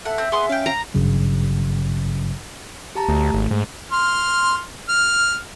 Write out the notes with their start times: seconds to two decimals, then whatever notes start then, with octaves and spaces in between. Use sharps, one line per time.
0.05 A4 E5 F#5
0.18 C4
0.32 B3 G#4 C6 D#6
0.49 C#4 F5 G5
0.66 A#5
0.94 G#1 G2 C#3 F#3
2.95 G4 A5 A#5
3.09 D2 A3
3.34 G#1
3.51 G#2
3.92 C6 F6
4.89 F6